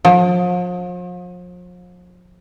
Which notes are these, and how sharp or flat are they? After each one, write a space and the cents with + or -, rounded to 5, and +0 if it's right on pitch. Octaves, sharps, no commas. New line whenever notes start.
F3 +40